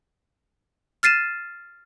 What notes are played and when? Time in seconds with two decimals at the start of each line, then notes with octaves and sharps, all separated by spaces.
1.03 F6 A6 C7 D#7 E7